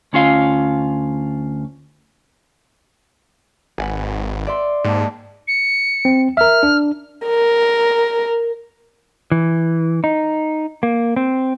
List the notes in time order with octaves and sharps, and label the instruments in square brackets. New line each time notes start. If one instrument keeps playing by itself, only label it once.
[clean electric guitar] D2 C#4 F4 F5
[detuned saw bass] G#1 [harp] B4 F#5 G#5
[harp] D5 E5 C6
[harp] D#2 A5 [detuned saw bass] G#2
[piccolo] C#7
[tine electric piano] C4
[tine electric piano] A#4 E5 [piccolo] F6
[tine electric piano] D4
[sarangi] A#4
[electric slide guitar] E3
D#4
A#3
C4